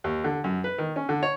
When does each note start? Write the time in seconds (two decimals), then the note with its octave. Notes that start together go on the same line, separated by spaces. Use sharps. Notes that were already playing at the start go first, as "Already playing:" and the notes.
0.04 D#2
0.24 D3
0.44 F#2
0.64 B4
0.78 D#3
0.96 C#4
1.09 D3
1.23 C#5